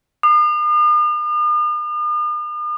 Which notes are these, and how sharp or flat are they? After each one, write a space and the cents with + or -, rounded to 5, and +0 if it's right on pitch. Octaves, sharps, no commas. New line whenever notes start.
D#6 -45